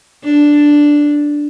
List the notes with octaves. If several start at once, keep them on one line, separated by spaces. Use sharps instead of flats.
D4